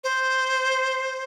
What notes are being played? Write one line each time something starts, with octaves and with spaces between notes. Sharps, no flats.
C5